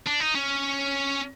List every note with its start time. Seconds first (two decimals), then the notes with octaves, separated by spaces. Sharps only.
0.07 D4
0.21 D#4
0.35 C#4